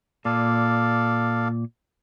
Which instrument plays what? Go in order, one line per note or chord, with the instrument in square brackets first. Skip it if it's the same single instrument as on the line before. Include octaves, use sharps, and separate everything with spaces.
[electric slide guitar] A#2 [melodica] A4 D5 F5